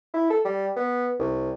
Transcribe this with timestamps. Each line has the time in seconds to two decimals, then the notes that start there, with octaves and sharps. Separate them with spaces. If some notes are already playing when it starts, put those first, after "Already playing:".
0.14 E4
0.30 A4
0.45 G3
0.77 B3
1.20 C2